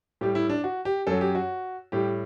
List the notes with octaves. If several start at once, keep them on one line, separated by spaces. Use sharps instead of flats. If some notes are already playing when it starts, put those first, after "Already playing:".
A2 G3 G4
E4
D4
F#4
G4
F#2 F#3 A4
G4
F#4
A2 G3 G4